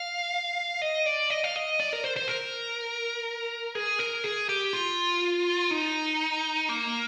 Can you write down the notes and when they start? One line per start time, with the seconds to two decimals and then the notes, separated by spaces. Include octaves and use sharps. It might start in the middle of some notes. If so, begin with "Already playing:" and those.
Already playing: F5
0.82 D#5
1.06 D5
1.30 D#5
1.44 F5
1.56 D#5
1.80 D5
1.93 A#4
2.04 C5
2.16 C5
2.28 A#4
3.75 G#4
3.99 A#4
4.24 G#4
4.49 G4
4.73 F4
5.71 D#4
6.69 A#3